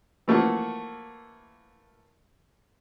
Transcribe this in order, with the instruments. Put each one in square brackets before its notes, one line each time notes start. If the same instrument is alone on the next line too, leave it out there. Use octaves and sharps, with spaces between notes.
[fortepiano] E3 F3 A3 A#3 F#4